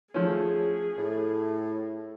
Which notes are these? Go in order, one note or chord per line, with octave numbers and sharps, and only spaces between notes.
F3 A3 C#4 G#4
A2